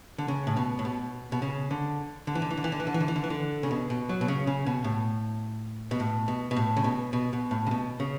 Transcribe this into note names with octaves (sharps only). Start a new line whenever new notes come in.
D3
C#3
A2
B2
A2
B2
B2
C#3
D3
D3
E3
D3
E3
D3
E3
D3
E3
D3
E3
D3
E3
D3
E3
D3
C#3
B2
B2
F#3
B2
C#3
C#3
B2
A2
B2
A2
B2
B2
A2
C#3
B2
B2
B2
A2
C#3
B2
C#3